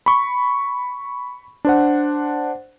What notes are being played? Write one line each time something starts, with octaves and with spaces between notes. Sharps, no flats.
B5 C#6
D4 C5 F#5